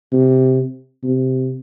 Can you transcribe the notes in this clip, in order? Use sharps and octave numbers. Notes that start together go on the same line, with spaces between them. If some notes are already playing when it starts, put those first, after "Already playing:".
C3
C3